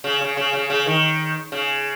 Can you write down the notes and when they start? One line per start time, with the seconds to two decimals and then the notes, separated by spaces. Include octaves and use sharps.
0.04 C#3
0.21 C#3
0.37 C#3
0.53 C#3
0.70 C#3
0.86 D#3
1.52 C#3